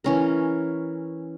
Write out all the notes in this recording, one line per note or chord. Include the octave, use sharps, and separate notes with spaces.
E3 C#4 A#4